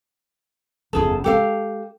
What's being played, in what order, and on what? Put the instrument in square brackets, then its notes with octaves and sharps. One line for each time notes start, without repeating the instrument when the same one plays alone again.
[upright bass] F#1 E2 [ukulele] E4 G#4 A4
[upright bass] G#3 D4 [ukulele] G4 A4 F5